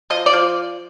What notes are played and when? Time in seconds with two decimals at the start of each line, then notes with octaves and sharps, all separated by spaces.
0.10 F3 D#5
0.26 D5
0.33 F3